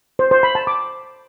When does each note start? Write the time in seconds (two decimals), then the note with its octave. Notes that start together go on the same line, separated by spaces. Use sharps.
0.19 C5
0.31 C5
0.43 B5
0.55 A5
0.67 D6